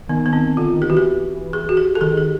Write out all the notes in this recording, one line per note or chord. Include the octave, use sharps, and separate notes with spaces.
D#3 B3
B3
D#3 C4
D3 F4
D#3
G4
E3 F#4
G4
G#4
F#4
G4
A4
D#3 G#4
G4